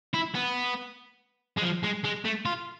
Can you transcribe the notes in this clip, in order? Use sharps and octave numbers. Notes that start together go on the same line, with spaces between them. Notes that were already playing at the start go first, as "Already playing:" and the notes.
E4
B3
G#3
F3
G#3
G#3
A3
F4